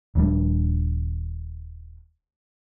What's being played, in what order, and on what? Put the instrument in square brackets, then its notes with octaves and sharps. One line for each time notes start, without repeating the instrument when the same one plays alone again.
[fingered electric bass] D#1 F3 G3 D4